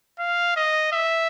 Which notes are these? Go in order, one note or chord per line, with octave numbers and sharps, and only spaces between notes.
F5
D#5
E5